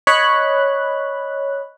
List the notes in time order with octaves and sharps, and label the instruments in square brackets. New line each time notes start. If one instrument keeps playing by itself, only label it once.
[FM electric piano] C#5 D#5 B5 F#6